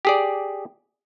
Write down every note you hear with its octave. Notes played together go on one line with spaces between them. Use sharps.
G4 G#4 D5